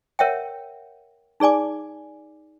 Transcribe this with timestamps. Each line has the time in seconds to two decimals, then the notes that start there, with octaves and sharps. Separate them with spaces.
0.19 A#4 C#5 E5 F#5 G5
1.40 D#4 G#4 D5 G#5 D6